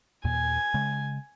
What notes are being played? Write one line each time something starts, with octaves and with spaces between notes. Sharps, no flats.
D#2 A#2 G#5
C#3 G#3